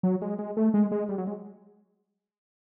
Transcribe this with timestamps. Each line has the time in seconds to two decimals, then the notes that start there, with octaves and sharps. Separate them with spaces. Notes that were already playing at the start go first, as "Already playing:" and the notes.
0.03 F#3
0.22 G#3
0.39 G#3
0.57 A3
0.74 G#3
0.91 G#3
1.09 G3
1.18 F#3
1.27 G#3